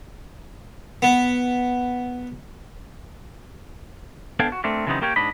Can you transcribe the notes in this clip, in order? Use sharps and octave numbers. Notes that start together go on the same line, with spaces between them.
B3
B3 D4 A4 F5 G5 G#5
F#4
A3 C4 D4 A#4
C#3 E3 F#3 B3 C4 D#4
A#3 G4 A#4 C#5 G5
G#2 D4 D#5 B5